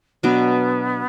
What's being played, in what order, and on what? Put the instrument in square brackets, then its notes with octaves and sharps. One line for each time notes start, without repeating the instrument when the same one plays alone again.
[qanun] B2 F#3 D4 [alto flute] B3